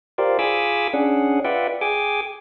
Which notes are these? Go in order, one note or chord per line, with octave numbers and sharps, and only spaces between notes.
F4 G4 A#4 C5 D5
F4 G#4 G#5 B5 D6 E6
C#4 D4 G#4 F#5
F4 B4 D5 E5 F#5 G5
G#4 G5 G#5 D6